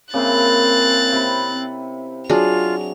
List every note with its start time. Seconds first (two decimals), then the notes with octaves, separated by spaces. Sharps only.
0.14 C#3 A#3 C4 E4 F#6 A6
1.13 C3 B5
2.29 F#3 D4 F4 G#4 F7